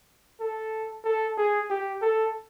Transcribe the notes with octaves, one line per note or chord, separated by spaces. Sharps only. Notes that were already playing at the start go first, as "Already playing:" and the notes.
A4
A4
G#4
G4
A4